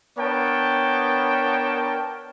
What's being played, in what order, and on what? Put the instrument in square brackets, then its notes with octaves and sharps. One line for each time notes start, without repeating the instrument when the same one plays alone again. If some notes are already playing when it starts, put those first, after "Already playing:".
[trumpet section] B3 D4 A#4 C#5 G5 A5